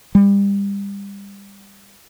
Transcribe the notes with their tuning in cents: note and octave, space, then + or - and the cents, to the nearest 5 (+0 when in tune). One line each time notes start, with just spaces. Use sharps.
G3 +30